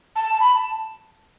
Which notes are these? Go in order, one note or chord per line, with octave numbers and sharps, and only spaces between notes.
A5
A5
B5
A5